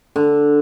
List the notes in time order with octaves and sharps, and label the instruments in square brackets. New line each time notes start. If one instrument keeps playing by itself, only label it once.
[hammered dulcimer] D3